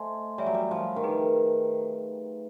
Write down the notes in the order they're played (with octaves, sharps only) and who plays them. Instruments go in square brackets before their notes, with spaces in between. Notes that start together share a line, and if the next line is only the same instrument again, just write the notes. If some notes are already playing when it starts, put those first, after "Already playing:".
Already playing: [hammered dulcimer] A3 [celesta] C5 D#5 G#5 C6
[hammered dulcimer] G3 [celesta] C#5 E5 G#5
[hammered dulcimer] F#3
G3
F3
D#3
[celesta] D#4 G#4 B4